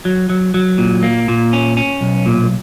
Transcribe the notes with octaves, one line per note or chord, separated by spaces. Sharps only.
F#3
F#3
F#3
A#2
A#3
A#2
C#4
C#4
B1
A#2